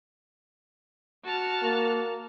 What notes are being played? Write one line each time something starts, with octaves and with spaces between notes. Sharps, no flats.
F#4 A5 F6
A#3